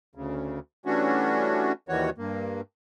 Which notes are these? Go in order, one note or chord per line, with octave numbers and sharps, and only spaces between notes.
D2 C#3
E3 G3 A3 C#4 D4 F#4
D#2 D#3 E3 G3 F#4 C#5
G2 A#3